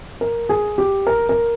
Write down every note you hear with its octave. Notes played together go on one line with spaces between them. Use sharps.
A#4
G#4
G4
A#4
A#4